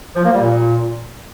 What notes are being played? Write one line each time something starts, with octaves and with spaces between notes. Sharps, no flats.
F3
A#3
G3
A#2